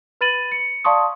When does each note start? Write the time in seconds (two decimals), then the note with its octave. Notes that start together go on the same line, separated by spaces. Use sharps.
0.21 B4 B5 A6 D#7 F#7
0.52 C#7
0.85 D5 F5 A5 C6 C#6 D#6